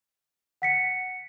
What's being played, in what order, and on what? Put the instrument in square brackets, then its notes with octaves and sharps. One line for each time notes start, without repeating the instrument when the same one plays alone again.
[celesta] F#5 B6 C#7